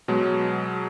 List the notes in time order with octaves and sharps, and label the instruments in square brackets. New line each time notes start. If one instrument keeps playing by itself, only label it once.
[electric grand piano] B2 F#3 G#3